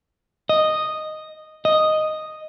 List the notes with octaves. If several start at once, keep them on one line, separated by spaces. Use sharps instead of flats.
D#5
D#5